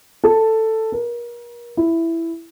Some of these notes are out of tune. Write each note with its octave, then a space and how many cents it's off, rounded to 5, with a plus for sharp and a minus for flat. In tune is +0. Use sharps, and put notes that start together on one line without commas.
A4 +10
A#4 +35
E4 +5